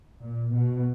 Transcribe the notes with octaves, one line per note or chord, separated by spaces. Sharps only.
A#2
B2